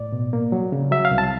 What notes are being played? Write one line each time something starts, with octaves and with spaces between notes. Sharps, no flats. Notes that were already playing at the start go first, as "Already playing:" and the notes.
Already playing: A2 D5
B2
A#3
F#3
C#3
F#3 E5
F5
C2
A5